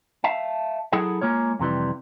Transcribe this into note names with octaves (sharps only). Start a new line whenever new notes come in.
E5 F5 A5
F#3 E4 G#4 A4 F#5
G#3 A#3 F4 C#5
F2 C3 E3 G3